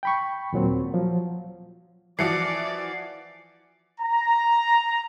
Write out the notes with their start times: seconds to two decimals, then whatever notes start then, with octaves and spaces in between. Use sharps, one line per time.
0.03 G5 B5 C#6
0.53 D#2 A#2 F#3 C4
0.94 F3 F#3
2.19 E3 F3 F#4 D5 C7 C#7
4.01 A#5